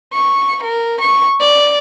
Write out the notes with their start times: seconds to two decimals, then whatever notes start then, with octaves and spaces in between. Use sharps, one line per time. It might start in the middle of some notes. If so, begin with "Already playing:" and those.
0.13 C#6
0.63 A#4
1.01 C#6
1.40 D5